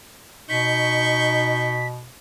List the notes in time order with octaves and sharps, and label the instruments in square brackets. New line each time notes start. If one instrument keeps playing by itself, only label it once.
[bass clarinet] B2 [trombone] D#4 [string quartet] C#6 G6 [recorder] B6